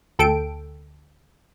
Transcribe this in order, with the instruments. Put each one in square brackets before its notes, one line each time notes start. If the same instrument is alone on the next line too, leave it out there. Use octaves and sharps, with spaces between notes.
[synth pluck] D2 A4 G5 D7